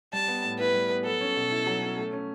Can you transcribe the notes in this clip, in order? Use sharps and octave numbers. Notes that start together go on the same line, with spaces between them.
G3 A5
B3
A2
E4 B4
G3
B3
F#3 A4
C#4
B2
E4
F#3
C#4
A3
C#4